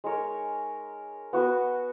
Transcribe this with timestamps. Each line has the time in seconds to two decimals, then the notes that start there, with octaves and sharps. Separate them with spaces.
0.04 G#3 D#4 A#4 C#5
1.33 B3 F#4 B4